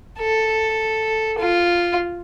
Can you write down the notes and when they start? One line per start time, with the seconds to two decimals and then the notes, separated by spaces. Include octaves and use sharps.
0.19 A4
1.38 F4